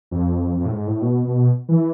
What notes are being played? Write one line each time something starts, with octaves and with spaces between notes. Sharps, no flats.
F2
F2
A2
G#2
A2
B2
B2
E3